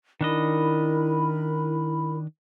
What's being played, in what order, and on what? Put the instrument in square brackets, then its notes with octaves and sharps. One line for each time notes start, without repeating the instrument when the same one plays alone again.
[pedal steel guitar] D#3 D4 D#5 [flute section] E4 A#4 B5